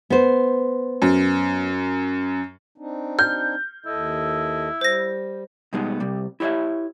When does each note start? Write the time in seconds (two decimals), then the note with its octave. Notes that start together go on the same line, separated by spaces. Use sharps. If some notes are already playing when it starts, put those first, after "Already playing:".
0.10 B3 C5
1.02 F#2
2.78 C4 D4 D#4
3.19 F6 G6
3.86 D#2 E4 A4 D#5
4.81 G3 C5 A#6
5.73 B2 G3 G#3 B3 D#4
6.00 C3 G3
6.40 E4 G4 C#5 D5 E5